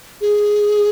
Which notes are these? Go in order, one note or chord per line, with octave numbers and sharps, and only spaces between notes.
G#4